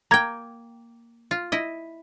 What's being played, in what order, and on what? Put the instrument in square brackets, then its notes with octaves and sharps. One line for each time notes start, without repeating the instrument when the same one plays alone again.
[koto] A#3 G5 [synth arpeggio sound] A#5 G#6
[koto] F4
E4 D#5